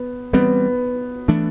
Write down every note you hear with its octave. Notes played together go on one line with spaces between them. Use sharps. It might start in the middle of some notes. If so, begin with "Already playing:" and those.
Already playing: B3
E3 G3 B3 C4
E3 A3 D4